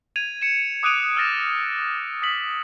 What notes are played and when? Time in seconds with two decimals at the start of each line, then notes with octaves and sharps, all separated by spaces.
0.16 G#6 D#7 F7
0.42 C#7 E7
0.83 D6 D#6 F#6 D7 D#7 F7
1.17 E6 F6 A6 A#6 E7
2.22 D#6 B6 F#7